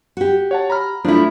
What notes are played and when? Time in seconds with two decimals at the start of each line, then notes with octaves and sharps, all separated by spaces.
0.17 F#4 G4
0.51 C#5 F#5 A5
0.70 A#5 B5 F6
1.05 F3 A3 D4 E4